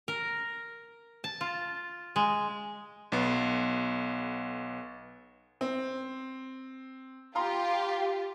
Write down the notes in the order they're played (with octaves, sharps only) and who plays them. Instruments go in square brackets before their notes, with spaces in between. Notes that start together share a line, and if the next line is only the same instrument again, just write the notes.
[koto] A#4
A5
F4
G#3
[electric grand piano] B1 B3
[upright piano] C4
[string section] F4 G4 [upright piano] F5 A#5 C6